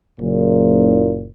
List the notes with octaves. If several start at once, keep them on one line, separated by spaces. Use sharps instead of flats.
F#1 A#2